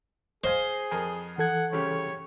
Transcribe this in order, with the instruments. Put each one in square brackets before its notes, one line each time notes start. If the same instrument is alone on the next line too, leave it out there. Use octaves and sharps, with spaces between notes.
[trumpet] G#4 [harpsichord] C5 [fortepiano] D#5 F5 G#5
[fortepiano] F2 A#4 G#5
[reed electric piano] E3 A4 G#6 [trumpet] F#5
[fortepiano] C2 C#3 G4 [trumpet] C#5